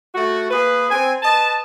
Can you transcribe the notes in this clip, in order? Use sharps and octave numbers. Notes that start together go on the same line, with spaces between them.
A3 F#4
A#3 G#4 B4
C4 G#5
B4 D#5 A5